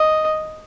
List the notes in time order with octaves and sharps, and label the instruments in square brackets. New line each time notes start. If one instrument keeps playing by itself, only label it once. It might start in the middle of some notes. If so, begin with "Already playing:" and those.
Already playing: [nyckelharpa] D#5